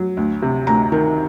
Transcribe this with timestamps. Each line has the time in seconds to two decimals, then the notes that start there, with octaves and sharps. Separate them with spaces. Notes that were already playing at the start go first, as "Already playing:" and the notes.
Already playing: F#3
0.17 D2
0.42 C3
0.67 D2 A#5
0.92 D#3